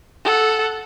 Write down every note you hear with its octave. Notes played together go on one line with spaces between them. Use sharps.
A4 F#5